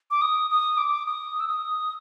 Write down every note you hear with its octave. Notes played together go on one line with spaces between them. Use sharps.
D6
D#6
D#6
D6
D#6
E6
D#6